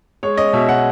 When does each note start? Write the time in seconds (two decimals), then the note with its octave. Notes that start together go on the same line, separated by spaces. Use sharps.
0.23 G#3 C#5
0.37 C#4 D#5
0.53 B2 E5
0.69 B2 F#5